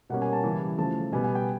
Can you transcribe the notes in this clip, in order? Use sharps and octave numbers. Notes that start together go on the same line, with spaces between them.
B2 G3 A#3 C#4 F#5
G#5
A5
C#3 E3 G3
C#3 F3 A3 A5
B2 G3 B3 G#5
G#5
G5